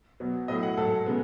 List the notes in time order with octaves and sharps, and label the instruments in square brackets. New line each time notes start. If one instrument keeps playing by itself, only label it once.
[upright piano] B2 F#3 B3
A2 F#3 A3 D#5
F#5
G#2 F#3 A3 A4
C#3 G#3 B3